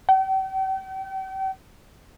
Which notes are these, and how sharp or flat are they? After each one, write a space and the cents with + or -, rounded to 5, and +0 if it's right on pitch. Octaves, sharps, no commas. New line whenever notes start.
G5 -40